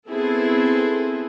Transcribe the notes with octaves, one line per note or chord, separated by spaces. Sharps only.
B3 C4 E4 G#4 A4